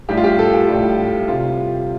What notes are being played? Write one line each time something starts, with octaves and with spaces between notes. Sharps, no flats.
A2 G3 G4
F4
G4
A4
G4
A2 G3
C3 G3 F4